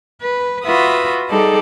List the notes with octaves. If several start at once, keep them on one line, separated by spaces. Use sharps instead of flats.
B4
F4 F#4 B4 E5 B5 D#6
G3 D#4 G#4 A4 D5